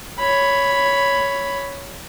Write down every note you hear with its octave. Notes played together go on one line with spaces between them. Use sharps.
C#5 B5